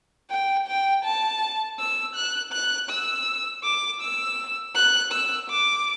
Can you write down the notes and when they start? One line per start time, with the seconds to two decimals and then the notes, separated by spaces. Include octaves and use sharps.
0.30 G5
0.68 G5
1.05 A5
1.79 E6
2.15 F#6
2.53 F#6
2.90 E6
3.64 D6
4.01 E6
4.75 F#6
5.12 E6
5.50 D6